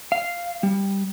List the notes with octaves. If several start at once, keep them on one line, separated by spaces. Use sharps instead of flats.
F5
G3